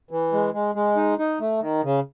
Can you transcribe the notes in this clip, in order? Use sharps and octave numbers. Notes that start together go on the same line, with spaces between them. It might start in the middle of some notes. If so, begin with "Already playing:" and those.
E3
G#3
G#3
G#3
D#4
D#4
A3
D#3
C#3